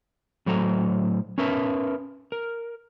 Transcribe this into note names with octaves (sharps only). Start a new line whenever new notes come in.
A2 F#3 A4 C5 A#5
C#4 A#4 B4 E5 A5
A#4